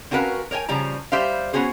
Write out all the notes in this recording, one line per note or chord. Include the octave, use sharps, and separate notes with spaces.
C4 C#4 F#4 A#4 B4 F5
A#4 C#5 G5 G#5
C#3 F3 G3 C#4 A#5
G3 G4 C5 E5 F5
B3 C#4 F#4 G#4 C5